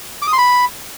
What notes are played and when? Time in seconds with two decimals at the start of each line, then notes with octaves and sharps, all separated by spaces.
0.22 D6
0.27 D#6
0.33 C6
0.38 B5